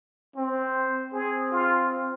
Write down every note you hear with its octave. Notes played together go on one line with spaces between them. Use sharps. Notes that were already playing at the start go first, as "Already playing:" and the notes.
C4 C5
C4 G#4
F4